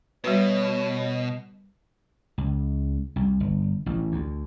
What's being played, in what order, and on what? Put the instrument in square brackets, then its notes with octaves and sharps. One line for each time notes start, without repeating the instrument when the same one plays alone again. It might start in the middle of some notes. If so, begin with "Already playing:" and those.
[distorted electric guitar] B2 [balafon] G3 F#4 B4 [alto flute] C#5
[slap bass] C#2
C2
G1
A1
D2